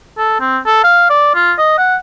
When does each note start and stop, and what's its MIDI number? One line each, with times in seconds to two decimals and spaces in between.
0.18 0.38 69
0.40 0.59 60
0.66 0.82 69
0.84 1.09 77
1.10 1.33 74
1.35 1.53 65
1.58 1.78 75
1.78 1.96 78